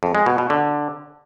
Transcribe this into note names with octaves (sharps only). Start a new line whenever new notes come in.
F2
G#3
B2
B2
D3